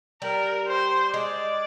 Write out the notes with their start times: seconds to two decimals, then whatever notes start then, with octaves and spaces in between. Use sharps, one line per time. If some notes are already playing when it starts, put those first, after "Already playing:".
0.22 G3 A#4
0.68 C5
1.13 G#3 D5